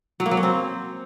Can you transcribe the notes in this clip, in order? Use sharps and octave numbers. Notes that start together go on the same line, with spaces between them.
F#3
A#3
F#3
C#4
C4